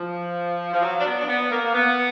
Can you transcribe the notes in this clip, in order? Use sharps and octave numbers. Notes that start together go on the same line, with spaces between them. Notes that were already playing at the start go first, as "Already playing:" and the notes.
Already playing: F3
F3
F#3
D4
B3
D4
B3
A#3
A#3
B3